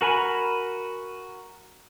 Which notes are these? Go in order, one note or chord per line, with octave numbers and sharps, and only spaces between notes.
F#4 A#4 G#5 B5